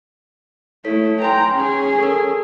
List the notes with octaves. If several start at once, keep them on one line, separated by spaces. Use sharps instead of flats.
A3 E4 A4 C#5 B6
B4 G5 G#5 A#5 C6
C#4 G#4
A4 A#4